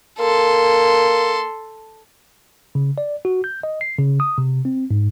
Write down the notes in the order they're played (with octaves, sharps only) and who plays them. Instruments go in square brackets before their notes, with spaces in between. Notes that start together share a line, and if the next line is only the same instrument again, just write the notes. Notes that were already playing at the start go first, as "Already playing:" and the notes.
[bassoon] A#3 [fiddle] A4 C6
[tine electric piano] C#3
D5
F#4
G6
D#5
C7
C#3
D#6
C3
C4
G#2